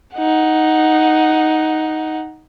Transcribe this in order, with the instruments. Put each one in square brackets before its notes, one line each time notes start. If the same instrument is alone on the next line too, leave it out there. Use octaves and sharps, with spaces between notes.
[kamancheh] D#4 F#5